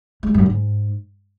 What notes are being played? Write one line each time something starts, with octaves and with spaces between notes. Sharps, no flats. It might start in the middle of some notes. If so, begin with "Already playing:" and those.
G#3
F#2
G#2